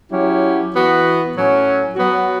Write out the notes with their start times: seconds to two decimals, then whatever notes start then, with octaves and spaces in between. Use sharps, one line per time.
0.11 F#3 C#4 E4 G4
0.73 E3 B3 F#4
1.35 A2 F#3 C#4
1.96 F#3 B3 F#4